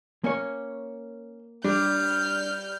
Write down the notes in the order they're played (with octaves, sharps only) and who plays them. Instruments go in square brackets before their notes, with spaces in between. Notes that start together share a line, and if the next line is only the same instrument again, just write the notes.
[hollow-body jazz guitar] A#3 C#5 [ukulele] C#4
[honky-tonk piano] G3 [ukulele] D4 [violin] F6 G6